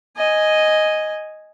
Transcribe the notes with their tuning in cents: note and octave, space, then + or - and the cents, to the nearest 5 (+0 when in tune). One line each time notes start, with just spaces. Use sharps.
D#5 +0 G#5 +0